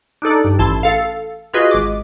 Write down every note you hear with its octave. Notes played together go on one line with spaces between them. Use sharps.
D4 D#4 A4 D5
G2
A1 E4 A5 C6
A4 F5
F4 F#4 G#4 B4 D#5
G#1 D6